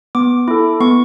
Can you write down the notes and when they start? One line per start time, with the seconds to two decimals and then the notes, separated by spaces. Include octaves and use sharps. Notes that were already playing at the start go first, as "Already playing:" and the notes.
0.15 B3 D6
0.48 E4 A4
0.80 B3 C#6